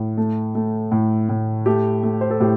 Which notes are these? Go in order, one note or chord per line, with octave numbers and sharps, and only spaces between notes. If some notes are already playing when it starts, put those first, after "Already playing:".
Already playing: A2
A3
A3
A2
A2
A3 G4
A3
C5
A4
A2 G4